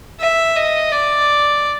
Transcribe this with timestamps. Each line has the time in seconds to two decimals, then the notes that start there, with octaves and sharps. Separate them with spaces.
0.20 E5
0.56 D#5
0.92 D5